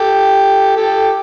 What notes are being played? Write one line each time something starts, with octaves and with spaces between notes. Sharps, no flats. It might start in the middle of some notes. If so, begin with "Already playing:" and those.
Already playing: G4 A4
G4 A4